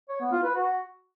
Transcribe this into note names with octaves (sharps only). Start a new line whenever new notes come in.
C#5
B3
F4
B4
F#4